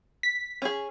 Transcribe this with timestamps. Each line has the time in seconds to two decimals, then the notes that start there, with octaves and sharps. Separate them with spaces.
0.23 B6
0.62 C#4 G#4